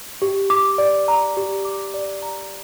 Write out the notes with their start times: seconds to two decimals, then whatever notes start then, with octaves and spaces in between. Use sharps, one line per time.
0.22 G4
0.50 D6
0.78 D5
1.08 A#5
1.37 G4
1.65 D6
1.94 D5
2.22 A#5